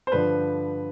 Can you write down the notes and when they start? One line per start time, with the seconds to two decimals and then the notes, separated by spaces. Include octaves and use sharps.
0.07 C5
0.12 G2 D3 F3 B4